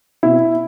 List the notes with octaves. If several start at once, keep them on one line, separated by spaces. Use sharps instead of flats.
B2 E4